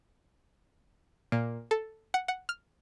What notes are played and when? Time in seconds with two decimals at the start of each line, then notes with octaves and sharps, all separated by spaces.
1.32 A#2
1.71 A4
2.14 F#5
2.28 F#5
2.49 F6